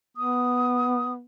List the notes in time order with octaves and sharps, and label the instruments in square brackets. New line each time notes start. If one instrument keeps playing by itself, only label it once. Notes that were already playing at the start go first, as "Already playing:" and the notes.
[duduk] B3 [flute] D#6